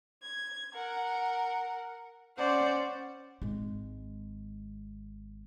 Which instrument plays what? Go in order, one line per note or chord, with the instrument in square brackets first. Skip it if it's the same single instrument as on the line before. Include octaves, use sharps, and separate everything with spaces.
[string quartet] G#6
A#4 F#5
C#4 C5 D5 F#5
[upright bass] G#1 G#3